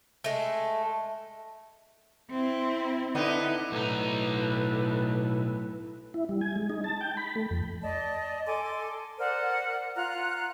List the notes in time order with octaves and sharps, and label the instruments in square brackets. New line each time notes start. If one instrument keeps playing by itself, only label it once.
[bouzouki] G#3 A3
[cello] C4 E4
[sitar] D3 B3 D#4 [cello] E4
[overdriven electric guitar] B1 D#4 [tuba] A2 [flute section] A4 B4
[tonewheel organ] E4
G3
G#5
G#3
D#4
A5
G5
B5
A3
F2
[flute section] D5 D#5 A5
A4 G#5 C6 D6
A#4 C5 D5 F#5
F4 F#5 A#5 F#6